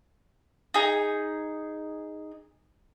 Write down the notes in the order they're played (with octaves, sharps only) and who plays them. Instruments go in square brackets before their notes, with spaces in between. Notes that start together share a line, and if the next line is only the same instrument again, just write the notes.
[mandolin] D#4 G#4